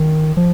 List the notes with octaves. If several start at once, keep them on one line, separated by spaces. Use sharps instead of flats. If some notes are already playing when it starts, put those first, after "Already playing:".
Already playing: D#3
F3